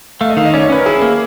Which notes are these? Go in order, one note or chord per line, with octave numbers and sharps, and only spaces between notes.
A3 F5
D#5
D#3 F5
D#5
C#4 D5
C#5
C#4 B4
A#4
E4 G#4
A#3